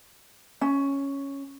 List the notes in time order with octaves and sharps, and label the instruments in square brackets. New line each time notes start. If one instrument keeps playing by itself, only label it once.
[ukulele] C#4